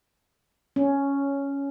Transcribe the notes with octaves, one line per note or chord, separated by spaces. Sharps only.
C#4